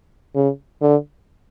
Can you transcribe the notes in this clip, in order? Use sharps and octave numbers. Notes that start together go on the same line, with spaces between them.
C#3
D3